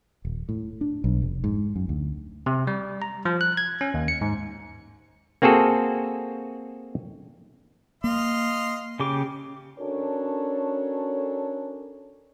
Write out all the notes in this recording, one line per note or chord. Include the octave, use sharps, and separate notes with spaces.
D#1
A2
D4
B1
F1
G#2
F#2
D2
C3
G3
A#5
F3
F#6
G#6
C#4
D#2
C#7
G#2
A#3 C4 F#4 G#4 A4
A#3 D#5 F5 C6
C#3 G4 D6
C#4 D4 F#4 A4 A#4 C#5